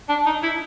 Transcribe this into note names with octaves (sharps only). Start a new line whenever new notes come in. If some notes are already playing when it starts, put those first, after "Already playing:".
D4
D#4
E4